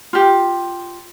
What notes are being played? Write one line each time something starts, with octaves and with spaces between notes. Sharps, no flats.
F4 G4